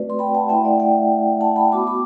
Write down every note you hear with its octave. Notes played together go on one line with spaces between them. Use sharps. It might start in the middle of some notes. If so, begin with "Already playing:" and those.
Already playing: A3 C4 F#4 B4 D5
C6
G5 B5
F#5 A5
A3 E4 E5 G5
D5 F#5
E5 G5
F#5 A5
G5 B5
B3 F#4 B5 D6
B5 D6